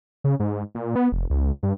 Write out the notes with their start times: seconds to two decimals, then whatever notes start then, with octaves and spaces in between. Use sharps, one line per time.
0.24 C#3
0.40 G#2
0.75 A#2
0.96 B3
1.12 F1
1.30 C#2
1.63 G2